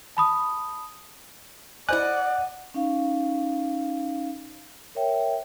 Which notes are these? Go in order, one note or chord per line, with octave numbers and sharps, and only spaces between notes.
A5 B5 D#6
E4 C5 D5 D#5 F#5 G#5 F#6
C#4 D#4 F5
A#4 C#5 E5 G5